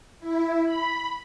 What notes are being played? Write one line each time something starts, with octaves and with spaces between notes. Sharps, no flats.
E4
B5